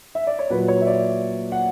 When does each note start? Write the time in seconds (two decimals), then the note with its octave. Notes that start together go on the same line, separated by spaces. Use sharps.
0.15 E5
0.27 D5
0.39 C#5
0.50 A#2 F#3 B4
0.68 C#5
0.82 E5
0.87 D5
1.52 F#5